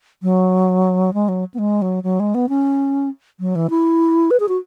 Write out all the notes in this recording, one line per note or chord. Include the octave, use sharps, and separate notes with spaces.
F#3
G#3
F#3
B3
G#3
F#3
F#3
G#3
B3
C#4
F#3
E3
E4
B4
G#4
F#4